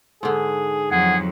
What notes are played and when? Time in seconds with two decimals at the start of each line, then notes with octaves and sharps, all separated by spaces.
0.23 G#2 D3 G#4
0.91 F2 F#3 G#4 F#5